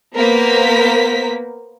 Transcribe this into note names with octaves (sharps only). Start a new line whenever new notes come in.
A#3 B3 A#4 C5 B6